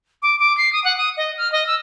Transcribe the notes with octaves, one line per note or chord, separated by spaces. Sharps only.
D6
D6
C7
D#6
F#5
D#6
D#5
F6
D#5
E6